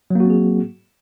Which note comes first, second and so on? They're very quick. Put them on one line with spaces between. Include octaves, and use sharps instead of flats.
F#3 A#3 F#4 C4 G#4